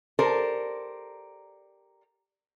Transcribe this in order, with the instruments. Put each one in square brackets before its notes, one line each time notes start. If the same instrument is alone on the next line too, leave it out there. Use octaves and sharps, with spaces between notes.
[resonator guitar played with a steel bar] G4 A4 A#4 C5 D5